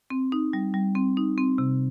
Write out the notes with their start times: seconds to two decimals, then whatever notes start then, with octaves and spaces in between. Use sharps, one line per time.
0.10 C4
0.32 D#4
0.53 G3
0.74 G3
0.95 C4
1.17 D#4
1.38 C4
1.58 C3